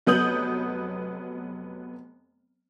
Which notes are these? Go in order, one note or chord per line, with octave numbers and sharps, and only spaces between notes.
F1 F#3 B3 D#6 G6 F#7